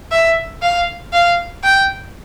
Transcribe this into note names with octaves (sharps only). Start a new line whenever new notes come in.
E5
F5
F5
G5